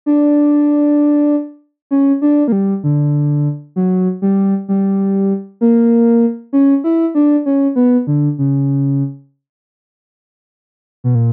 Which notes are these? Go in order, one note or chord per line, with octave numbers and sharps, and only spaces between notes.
D4
C#4
D4
A#3
G3
D3
F#3
G3
G3
A#3
C#4
E4
D4
C#4
B3
D3
C#3
B2
A#2